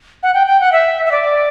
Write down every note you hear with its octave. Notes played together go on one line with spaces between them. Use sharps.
F#5
G5
G5
F#5
E5
E5
D5